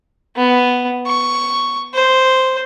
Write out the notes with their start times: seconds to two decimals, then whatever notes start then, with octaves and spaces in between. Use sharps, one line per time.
0.36 B3
1.07 C#6
1.94 C5